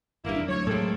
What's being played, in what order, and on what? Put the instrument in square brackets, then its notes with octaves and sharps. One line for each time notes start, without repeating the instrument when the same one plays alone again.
[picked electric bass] G#1 G2 [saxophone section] A#3 E4
[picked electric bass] E2 B2 D4
[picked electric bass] D2 [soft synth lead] F#3 [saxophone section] C#5
[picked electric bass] A2 G#3 [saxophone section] A#3 C4 A4